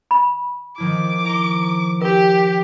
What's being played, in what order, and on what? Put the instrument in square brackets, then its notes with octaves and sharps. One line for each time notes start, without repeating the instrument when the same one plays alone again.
[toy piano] B5
[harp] D#3 F3 E4 [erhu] D6
[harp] A#5 C6
[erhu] G4 [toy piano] A#4